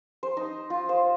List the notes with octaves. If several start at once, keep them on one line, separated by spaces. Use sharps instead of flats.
C5
D#4
F4
C5